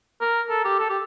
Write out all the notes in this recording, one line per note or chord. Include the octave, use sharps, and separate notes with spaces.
A#4
A4
G4
A4
G4